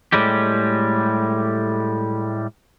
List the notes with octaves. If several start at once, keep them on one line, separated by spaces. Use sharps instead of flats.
A2 G3 G#3 G4